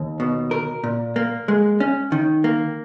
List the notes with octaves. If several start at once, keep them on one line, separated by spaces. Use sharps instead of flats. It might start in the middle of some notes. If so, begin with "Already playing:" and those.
Already playing: D#2
B2
A#4
A#2
A#3
G#3
C#4
D#3
A#3